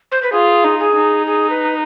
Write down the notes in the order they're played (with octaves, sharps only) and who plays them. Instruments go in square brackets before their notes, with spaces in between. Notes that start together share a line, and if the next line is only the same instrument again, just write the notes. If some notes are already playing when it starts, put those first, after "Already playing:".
[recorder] C5
B4
[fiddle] F4 [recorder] G#4
[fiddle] D#4
[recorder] G#4
[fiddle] D#4
[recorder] G#4
B4